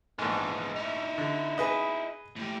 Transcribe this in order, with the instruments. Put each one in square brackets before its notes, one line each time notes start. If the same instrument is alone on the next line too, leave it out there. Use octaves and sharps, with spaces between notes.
[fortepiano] A#1 G#2 [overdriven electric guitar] G#3 B3
[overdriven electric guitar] D#4 E4
[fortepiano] D3
G#4 B4 D#5
[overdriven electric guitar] A2 G4